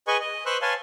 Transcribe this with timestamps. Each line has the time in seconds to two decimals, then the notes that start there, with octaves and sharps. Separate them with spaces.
0.07 G#4 B4 D#5 G#5 C#6
0.21 D#5
0.46 B4 C5 C6 C#6 E6 F#6
0.62 B4 C#5 F5 G#5 A5 C6